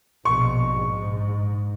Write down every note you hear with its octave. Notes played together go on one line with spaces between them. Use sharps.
A#1 B2 C#6
G#2